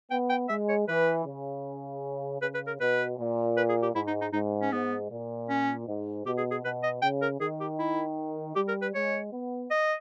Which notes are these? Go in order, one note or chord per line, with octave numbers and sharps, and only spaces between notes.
B3 G5
G5
G#3 E5
C#5
E3 B4
C#3
C#3 B4
B4
A#4
B2 B4
A#2
B4
G#4
G4
G#2 E4
D#4
D#4
G#2 D#4
C#4
G#2 B3
A#2
C#4
G#2
B2 G4
G#4
G#4
B2 B4
D#5
C#3 G5
A#4
D#3 G#4
G4
E4
G3 G4
A#4
B4
G#3 C#5
B3
D#5